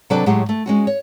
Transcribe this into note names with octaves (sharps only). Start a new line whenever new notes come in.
C3 F#3 D4 A4 B4 D5
A2 F#3 G#3 G4 F#5
A3
G#3 C#4 F#4
C#5